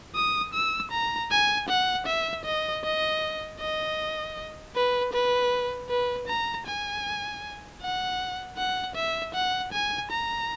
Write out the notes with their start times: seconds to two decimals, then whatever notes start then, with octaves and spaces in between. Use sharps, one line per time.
0.15 D#6
0.54 E6
0.92 A#5
1.31 G#5
1.69 F#5
2.07 E5
2.45 D#5
2.84 D#5
3.60 D#5
4.76 B4
5.14 B4
5.90 B4
6.28 A#5
6.66 G#5
7.82 F#5
8.57 F#5
8.96 E5
9.34 F#5
9.73 G#5
10.11 A#5